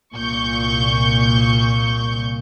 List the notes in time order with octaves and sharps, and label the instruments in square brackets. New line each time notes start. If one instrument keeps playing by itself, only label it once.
[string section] C2 A#2 C#6 G6